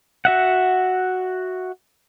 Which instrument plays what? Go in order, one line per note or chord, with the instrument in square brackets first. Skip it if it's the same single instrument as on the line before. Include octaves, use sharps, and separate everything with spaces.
[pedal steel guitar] F#4 E5 F#5